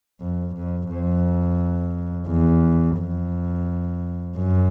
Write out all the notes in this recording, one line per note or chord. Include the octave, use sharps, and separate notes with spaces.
F2
F2
F2
E2
F2
F#2